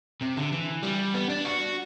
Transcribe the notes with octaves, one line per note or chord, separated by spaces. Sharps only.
C3
D3
E3
G3
B3
D4
F#4